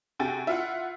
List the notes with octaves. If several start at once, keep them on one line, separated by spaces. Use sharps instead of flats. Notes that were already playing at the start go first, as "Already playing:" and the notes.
C3 F#4 G5 G#5 A6
E4 F4 F#5